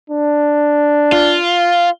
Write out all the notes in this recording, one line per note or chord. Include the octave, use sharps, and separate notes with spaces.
D4
F4